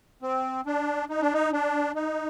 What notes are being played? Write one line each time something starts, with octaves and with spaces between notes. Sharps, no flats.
C4
D4
D#4
D4
D#4
D4
D#4